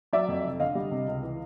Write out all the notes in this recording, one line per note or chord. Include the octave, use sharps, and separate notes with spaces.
F#3 D5 E5
F2
F1
D3 D#5 F5
G3
C3
C#2
E3